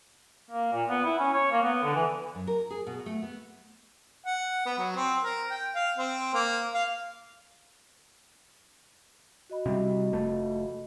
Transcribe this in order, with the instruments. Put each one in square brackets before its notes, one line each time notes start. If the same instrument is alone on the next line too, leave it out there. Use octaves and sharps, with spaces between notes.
[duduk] A#3
A#2
B3
E4
C#4
C#5
A#3
B3
D3
E3
[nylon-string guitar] F#2
A#4
G#4
B2
A3
B3
[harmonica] F#5
B3
F#3
C4
A#4
G5
F5
C4
A#3
F5
[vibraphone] F#4 D#5 B5
[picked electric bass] C3 G3
F1 A3